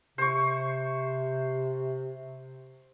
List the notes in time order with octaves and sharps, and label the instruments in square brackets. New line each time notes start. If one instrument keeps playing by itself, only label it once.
[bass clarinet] C3 [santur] C5 C#6